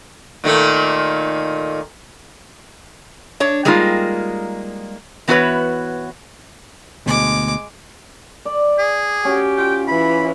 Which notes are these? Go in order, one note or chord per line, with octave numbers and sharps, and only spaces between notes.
A#2 D#3 A3
D4 C#5
G3 G#3 A#3 D#4 F4
E3 B3 F#4 A#4 B4 C#5
D2 B2 G#3 D6
D5
G#4
C#4 F#4 G4
F4 G5
E3 B5